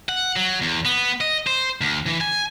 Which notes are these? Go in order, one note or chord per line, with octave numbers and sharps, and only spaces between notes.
F#5
F#3
E2
B3
D#5
C5
D2
E3
G#5